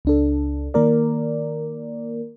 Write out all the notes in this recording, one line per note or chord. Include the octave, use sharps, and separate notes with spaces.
C#2 D4 A4
D#3 A#3 A#4 D5